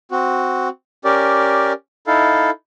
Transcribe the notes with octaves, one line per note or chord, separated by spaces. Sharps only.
C4 F#4
C#4 G4 A#4 D5
D#4 E4 A4 F5